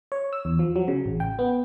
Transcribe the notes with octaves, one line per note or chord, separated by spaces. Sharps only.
C#5
E6
E2
F3
F#3
C#3
A1
G5
B3